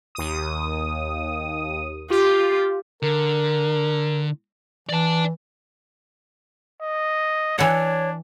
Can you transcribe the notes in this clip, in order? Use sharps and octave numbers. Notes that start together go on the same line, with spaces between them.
D#2 D#6
F4 G4
D3 A#4
E3 D5 A5
D#5
E3 D4 C#5 F#5